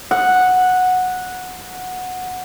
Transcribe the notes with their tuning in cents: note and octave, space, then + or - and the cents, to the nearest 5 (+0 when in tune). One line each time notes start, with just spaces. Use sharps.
F#5 -10